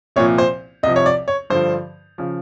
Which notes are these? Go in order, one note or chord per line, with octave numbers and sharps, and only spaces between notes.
C2 A#2 F3 C#5
C5
C2 C3 F3 D#5
C#5
D5
C#5
G2 D3 F3 C5
C#3 F3